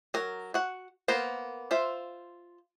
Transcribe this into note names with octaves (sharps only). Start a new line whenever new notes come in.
F#3 A#4
F#4 F#5
A#3 B3 A#4 C5
F4 C5 E5